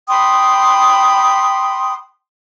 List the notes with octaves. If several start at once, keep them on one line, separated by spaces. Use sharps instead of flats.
G5 B5 C6 D#6